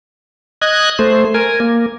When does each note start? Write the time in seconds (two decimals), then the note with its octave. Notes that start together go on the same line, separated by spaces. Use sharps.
0.62 D#5 F#6 G#6
0.99 A3 C5
1.34 A#4 G#5
1.60 A#3